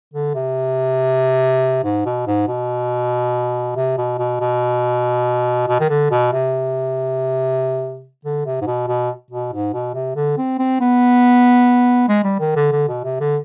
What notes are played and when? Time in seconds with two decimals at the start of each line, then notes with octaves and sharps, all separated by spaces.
0.14 D3
0.34 C3
1.84 G#2
2.05 B2
2.27 G#2
2.47 B2
3.76 C3
3.98 B2
4.18 B2
4.40 B2
5.68 B2
5.80 D#3
5.89 D3
6.11 B2
6.33 C3
8.25 D3
8.46 C3
8.61 G#2
8.67 B2
8.88 B2
9.30 B2
9.52 G#2
9.73 B2
9.94 C3
10.16 D3
10.38 C4
10.59 C4
10.80 B3
12.08 G#3
12.24 G3
12.40 D#3
12.56 D3
12.72 D3
12.88 B2
13.04 C3
13.20 D3